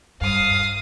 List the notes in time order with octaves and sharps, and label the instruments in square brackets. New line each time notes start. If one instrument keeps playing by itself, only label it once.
[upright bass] G2 [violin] F5 D#6